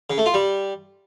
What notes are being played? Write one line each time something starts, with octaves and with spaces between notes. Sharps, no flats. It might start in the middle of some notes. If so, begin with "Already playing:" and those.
C#3
A3
F4
G3